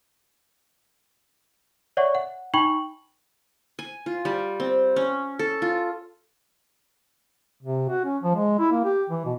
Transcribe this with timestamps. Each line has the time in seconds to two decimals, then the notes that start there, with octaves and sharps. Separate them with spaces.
1.97 C#5 D5 E5 F#5 C#6
2.15 F#5
2.54 D#4 G5 B5 C#6 F#7
3.79 G#5
4.06 F4
4.25 G3
4.60 C4
4.96 C#4
5.39 A4
5.62 F4
7.63 C3
7.89 F#4
8.05 C#4
8.23 F3
8.35 G#3
8.59 E4
8.71 A#3
8.84 G4
9.10 E3
9.25 B2